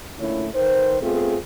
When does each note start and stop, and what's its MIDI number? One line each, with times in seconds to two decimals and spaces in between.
0.18 0.47 46
0.18 0.47 50
0.18 0.47 57
0.18 0.47 61
0.18 0.47 64
0.54 0.98 51
0.54 0.98 71
0.54 0.98 72
1.01 1.36 57
1.01 1.36 59
1.01 1.36 60
1.01 1.36 65
1.01 1.36 68